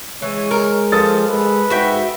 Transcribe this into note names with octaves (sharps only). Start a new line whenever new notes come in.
E3 G#3 C#5
A#4
F3 A4 D#6 A6
G#3 B4
G#2 F#4 E5 G5